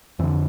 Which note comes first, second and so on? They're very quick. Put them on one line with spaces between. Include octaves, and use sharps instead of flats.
F2 E3 D3